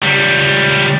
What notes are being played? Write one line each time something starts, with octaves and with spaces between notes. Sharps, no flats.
C#2 G3